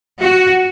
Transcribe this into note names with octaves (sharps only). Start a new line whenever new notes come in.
F#4